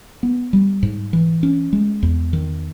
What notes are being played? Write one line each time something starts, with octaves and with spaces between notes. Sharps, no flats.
B3
G3
G#2
E3
C#4
G#3
E2
D#3